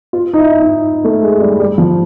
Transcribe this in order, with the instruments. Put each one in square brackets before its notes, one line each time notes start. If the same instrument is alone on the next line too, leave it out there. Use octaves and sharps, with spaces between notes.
[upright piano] F4
D#4
E4
D#4
A3
G#3
G3
G3
F3